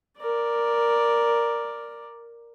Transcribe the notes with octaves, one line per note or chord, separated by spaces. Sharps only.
A#4 D5